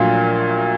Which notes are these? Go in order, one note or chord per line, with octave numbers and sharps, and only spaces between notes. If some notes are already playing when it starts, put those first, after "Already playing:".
Already playing: A#1 A#2 F#3 A3 F4